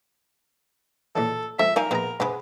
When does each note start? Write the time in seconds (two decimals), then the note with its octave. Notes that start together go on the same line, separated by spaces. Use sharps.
1.16 A#2 C#3 E3 A4
1.59 C#2 F3 A4 E5
1.76 G3 D#4 A#4 F5 G#5
1.91 A#1 B3 G#4 A#5
2.20 G2 C3 G#3 B3 B5